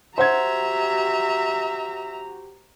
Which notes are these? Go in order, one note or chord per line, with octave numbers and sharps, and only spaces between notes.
F#4 G4 C5 E5 F#5 A#5 G#6